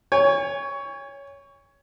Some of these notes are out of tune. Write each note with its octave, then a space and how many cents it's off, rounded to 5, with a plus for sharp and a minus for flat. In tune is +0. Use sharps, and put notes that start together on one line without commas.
C#5 +15 G#5 -40